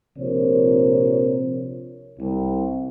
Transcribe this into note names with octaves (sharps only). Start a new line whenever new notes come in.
A#1 C3 F4 A#4 C5 C#5
C2